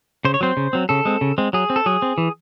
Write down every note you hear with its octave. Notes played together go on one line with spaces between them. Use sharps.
C#3 C5
C#5
F#3 C4 C5
C#3
F#3 C4
C#3 A4
G#3 C4
C#3
G#3 C4
F#3 G#4
C4
A4
F#3 G#4
C4
E3